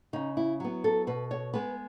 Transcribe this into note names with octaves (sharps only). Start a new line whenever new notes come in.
C#3 D#4
E4
F#3 B3
A4
B2 B4
C#5
G#3 B3 B4